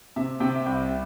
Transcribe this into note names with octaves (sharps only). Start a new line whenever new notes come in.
C3 E5
C3 G5
E5
C2 G5